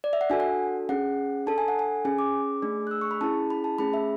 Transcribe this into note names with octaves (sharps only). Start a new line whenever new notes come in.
D5
E5
F#5
D4 F#4 A4 G#5
F#5
C#4 G#4 F#5
D4 A4 A5
G#5
F#5
G#5
C#4 G#4 G#5
D6
A3 D4 G#4
F#6
E6
C#6
B5
C#4 E4 G#4 A5
B5
A5
A3 C#4 G#4 B5
E5